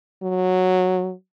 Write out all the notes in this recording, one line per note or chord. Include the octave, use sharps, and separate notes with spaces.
F#3